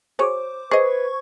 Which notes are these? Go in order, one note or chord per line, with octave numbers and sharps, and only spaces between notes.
F#4 G#4 C5 C#5 D6
G#4 B4 C5 D#5 C#6 G#6